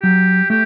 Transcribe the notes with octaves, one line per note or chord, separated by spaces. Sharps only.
F#3 G4
A3 G4